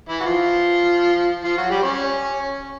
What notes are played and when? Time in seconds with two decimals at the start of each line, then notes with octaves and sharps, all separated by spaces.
0.09 E3 E4
0.20 F#4
0.26 F3 F4
1.44 F3 F4
1.57 F#3 F#4
1.70 G3 G4
1.83 C#4 C#5